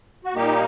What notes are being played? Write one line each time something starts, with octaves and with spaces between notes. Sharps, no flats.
F#4
A#2 G3 A#3 D#4 G4